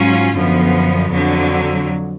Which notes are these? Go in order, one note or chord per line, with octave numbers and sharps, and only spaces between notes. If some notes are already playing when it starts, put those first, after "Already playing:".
Already playing: G#2 F#3 C#4 F4
F#2 D3 F3 B3
F2 D3 F#3